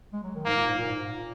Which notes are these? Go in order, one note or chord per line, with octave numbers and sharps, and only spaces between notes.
G#3
F#3
D#3
G#2 A#3
A#2
G#2
A#2
G#2
A#2